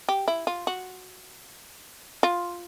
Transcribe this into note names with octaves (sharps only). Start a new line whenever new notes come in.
G4
E4
F4
F#4
F4